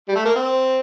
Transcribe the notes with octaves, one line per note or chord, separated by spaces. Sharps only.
G3
A3
A#3
C4